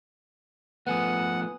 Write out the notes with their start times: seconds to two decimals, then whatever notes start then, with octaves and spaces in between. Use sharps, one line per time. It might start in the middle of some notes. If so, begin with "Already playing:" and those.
0.87 F3 A3 B3 B4 F#5 G#5 D#6